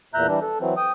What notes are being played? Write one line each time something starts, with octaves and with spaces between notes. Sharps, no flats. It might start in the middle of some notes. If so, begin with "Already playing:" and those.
E2 A#2 E5 A#5 F#6 G6
E3 G3 D4
A4
E3 F#3 C4
G5 D#6